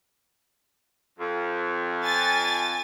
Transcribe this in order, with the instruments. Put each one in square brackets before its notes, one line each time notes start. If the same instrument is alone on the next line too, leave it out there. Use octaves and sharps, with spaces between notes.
[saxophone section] F2
[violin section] G#5 A6